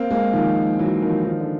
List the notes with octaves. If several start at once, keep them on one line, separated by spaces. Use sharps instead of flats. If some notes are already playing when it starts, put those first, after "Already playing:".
Already playing: A#3 C4
G#3 A#3
D#3 F3
E3 F#3
D#3 F3
D#3 F3
D3